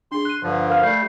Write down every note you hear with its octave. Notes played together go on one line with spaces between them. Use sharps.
D4 G#4 C6
F#6 D#7
G2 D3 F3
A#4 F5 F6
G3 A3 G6 C7